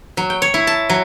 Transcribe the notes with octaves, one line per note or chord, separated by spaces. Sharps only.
F#3
G5
C#5
E4
A5
F#3